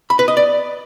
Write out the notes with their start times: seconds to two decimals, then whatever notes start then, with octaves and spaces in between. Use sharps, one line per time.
0.10 B5
0.19 B4
0.28 D#5
0.37 D5